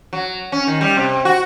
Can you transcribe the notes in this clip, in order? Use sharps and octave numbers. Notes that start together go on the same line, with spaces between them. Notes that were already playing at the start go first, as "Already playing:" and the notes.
F#3
C#4
D#3
G3
C3
F#4